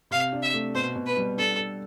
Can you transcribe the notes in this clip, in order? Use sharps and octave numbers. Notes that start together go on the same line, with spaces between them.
C3 F5
D4
E5
A3
B2 C5
B2
B4
G3
D4 A4
A4